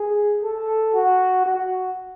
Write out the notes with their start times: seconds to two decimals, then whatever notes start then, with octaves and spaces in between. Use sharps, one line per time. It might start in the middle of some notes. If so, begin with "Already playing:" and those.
Already playing: G#4
0.43 A4
0.95 F#4
1.46 F#4